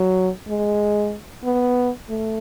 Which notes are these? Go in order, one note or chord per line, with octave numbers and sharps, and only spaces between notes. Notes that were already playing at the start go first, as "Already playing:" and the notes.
Already playing: F#3
G#3
B3
A3